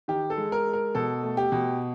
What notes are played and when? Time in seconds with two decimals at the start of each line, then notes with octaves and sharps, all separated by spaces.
0.08 D#3 G4
0.30 A4
0.37 G#3
0.52 A#4
0.67 G#3
0.73 A#4
0.95 B2 A4
1.23 A3
1.37 G4
1.52 B2